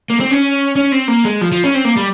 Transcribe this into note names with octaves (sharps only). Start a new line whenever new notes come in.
A#3
C4
C#4
C#4
C4
A#3
G#3
F3
F3
C#4
C4
A#3
G3